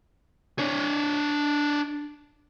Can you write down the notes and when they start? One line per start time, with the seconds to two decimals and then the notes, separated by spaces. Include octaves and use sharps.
0.59 D4 C#5